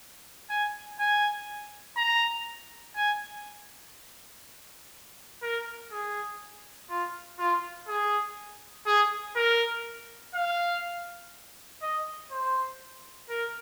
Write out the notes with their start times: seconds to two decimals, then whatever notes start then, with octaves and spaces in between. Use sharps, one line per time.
0.50 G#5
0.99 G#5
1.97 A#5
2.96 G#5
5.42 A#4
5.91 G#4
6.89 F4
7.39 F4
7.88 G#4
8.86 G#4
9.36 A#4
10.34 F5
11.82 D#5
12.31 C5
13.29 A#4